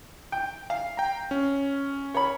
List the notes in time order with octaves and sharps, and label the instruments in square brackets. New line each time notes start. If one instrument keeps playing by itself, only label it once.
[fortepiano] G5
F5
[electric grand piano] G5 A#5
C#4
[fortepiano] C#5 B5